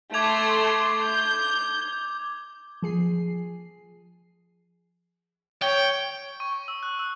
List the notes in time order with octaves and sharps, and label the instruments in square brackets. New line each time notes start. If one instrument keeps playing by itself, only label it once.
[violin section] A3 C6 [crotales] D6 G#6 F7
[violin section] G6
[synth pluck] F3 G#4 C7
[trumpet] C#5 [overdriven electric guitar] G5
[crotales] C#6
E6
F#6
E6